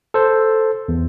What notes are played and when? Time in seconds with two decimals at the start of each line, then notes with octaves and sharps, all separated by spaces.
0.14 A4 C5
0.88 E2